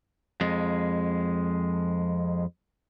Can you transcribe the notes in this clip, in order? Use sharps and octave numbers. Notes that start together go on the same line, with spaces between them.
F2 G#3